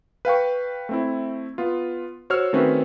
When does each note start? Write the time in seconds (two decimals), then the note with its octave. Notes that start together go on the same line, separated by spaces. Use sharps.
0.25 B4 F5 G5 C#6
0.89 A3 C4 E4
1.58 B3 F4
2.30 F#4 C5 C#5 E6 F6
2.53 D#3 A3 C4 C#4 F#4 B4